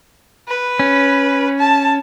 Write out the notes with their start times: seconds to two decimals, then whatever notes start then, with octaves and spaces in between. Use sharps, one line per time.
0.48 B4
0.79 C#4
1.59 A5